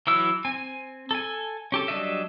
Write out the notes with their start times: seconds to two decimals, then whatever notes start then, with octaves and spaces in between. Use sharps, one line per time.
0.07 E3 F#3 E4 E6
0.45 C4 G#5
1.11 A4 G#5
1.72 C#4 G4 A4
1.88 F#3 G3 D4 D#5 E5